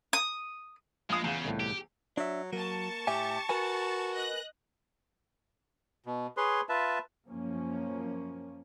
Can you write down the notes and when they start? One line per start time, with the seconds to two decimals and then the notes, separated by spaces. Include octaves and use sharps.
0.13 D#6
1.10 A#1 G#3 F4 F5 G#5 D#6
1.24 E2 C#3 F4
1.45 C2 A2
1.60 G4
2.17 F#3 D4 E5
2.53 F#3 A#3 A5 C#6
3.07 A2 G4 E5 G#5
3.49 F#4 A#4 B4 G#5
4.14 D#5 F#6 A#6
6.06 B2
6.37 G#4 B4 C#5 C6
6.69 F4 B4 E5 A5
7.27 F#2 F3 A#3 C#4